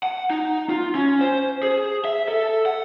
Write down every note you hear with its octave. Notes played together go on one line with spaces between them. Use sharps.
F#5
D#4
F4
C#4
C5
G#4
E5
A4
F#5